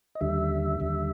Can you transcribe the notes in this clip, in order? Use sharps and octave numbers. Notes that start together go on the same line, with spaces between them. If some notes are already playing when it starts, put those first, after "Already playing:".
D#5
D#2 D3 G3 E5
D#2 D3 G3